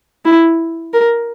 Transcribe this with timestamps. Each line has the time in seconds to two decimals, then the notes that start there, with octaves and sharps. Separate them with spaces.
0.25 E4
0.93 A#4